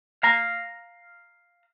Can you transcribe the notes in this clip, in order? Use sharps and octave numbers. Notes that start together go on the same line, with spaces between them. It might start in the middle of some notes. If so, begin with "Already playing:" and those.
F5 A#5